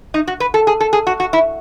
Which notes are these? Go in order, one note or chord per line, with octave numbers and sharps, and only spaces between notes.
D#4
F#4
B4
A4
G#4
A4
G#4
F#4
F#4
E4